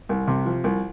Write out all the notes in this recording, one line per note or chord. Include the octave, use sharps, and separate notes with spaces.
C2
C3
F3
C2